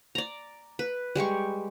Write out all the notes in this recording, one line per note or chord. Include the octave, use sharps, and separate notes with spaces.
D5 A#5
B4
G3 G#3 G4 C#6